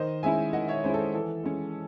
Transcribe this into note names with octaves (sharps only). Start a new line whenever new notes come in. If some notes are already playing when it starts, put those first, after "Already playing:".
Already playing: D#3 C5 D#5
G#3 C#4 E4 E5 G#5
D#3 D#5 F#5
C#5 E5
G#3 C#4 E4 C5
A4
C5
E3 A4
G#3 C#4